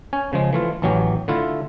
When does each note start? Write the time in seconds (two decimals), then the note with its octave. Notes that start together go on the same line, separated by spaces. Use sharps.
0.13 C#4 G#5
0.33 C#3 F3 G#3
0.53 E3 A3 F4
0.82 A1 E3 F#3 C#4 G4
1.28 D3 A3 E4 F4